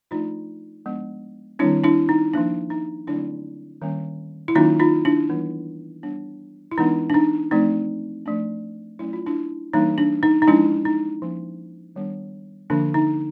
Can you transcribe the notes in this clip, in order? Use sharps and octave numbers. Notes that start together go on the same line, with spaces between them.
F3 A3 D4 D#4 F4
F3 G#3 B3 D4
D#3 G3 C4 D4 E4
D4 E4
D#4
F3 A#3 D4
D#4
D3 F#3 A3 C4 D4 E4
D#3 G3 A#3 C#4
E4
D#3 F#3 A#3 C#4 D#4 F4
D#4 F4
D4 E4
E3 G3 B3
G3 B3 D4
E4
E3 G#3 B3 D4 D#4
D4
D#4
F3 A3 C4 D#4
F3 A3 D4
F#3 A3 C#4 E4
F4
D4 E4
E3 G3 A#3 D4 D#4
D4
D#4
D#4
F3 G#3 C#4 D4 E4
D#4
F3 A#3 C#4
D#3 G3 B3 D4
D3 F3 A#3 D4
D#4